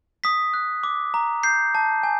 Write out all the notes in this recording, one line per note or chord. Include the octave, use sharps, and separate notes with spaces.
D#6 B6
F#6
D6
A#5
G6 C7
A5
G#5